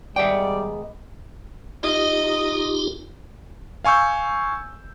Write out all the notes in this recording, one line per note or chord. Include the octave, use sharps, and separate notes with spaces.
G#2 D#3 G3 B3 D5 E5 F#5 G5
D#4 F4 G4 D#5
F5 G#5 C#6 E6 G6